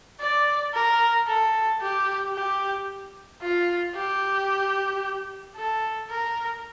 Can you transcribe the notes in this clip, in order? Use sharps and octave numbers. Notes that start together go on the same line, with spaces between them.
D5
A#4
A4
G4
G4
F4
G4
A4
A#4